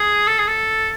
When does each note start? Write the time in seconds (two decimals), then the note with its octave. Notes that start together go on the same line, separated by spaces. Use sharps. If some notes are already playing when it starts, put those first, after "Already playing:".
Already playing: G#4
0.27 A4
0.38 G#4
0.47 A4